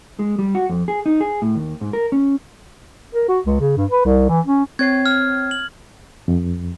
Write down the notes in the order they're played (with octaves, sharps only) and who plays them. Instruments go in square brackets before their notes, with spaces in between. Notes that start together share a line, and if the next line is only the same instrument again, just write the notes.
[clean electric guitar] G#3
G3
F#4
F2
G#4
D#4
G#4
A2
D#2
G#2
A#4
C#4
[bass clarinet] A#4
F#4
C#2
C#3
G2
B4
C2
E3
C#4
[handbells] C4 C#5 C7 [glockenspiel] G#6
[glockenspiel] F6
F#7
[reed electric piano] F2